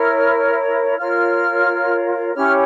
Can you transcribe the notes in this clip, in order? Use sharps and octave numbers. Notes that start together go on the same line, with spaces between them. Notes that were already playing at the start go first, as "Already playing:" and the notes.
Already playing: E4 A#4 C#5 F6
F4 A#4 C#5 F6
C#4 E4 G4 C#5 F6